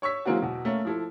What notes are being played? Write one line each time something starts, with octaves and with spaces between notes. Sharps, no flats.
C#5 C#6 E6 B6
E3 F#3 G#3 A#3 C4 F#4
E2 B2
A3 A#3 C#4
F3 E4 A4